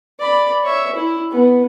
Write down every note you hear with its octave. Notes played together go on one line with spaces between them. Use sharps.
D5 B5
C#5 E5
E4
B3